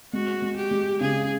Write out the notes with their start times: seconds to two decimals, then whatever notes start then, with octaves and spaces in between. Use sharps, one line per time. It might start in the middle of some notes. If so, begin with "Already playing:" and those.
0.13 G#3 F#4
0.42 G#3
0.57 G4
0.71 G#3
1.01 C#3 G#4